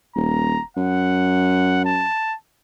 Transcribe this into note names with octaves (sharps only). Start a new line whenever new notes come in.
D#1 A#5
F#2 F#5
A5